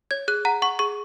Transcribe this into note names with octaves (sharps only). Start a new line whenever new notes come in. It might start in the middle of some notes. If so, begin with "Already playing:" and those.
C#5 G#6
G#4 F#6
F#5 A#5
F#5 C#6
G#4 C#6